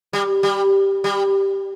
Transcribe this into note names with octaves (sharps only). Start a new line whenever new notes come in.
G3
G3
G3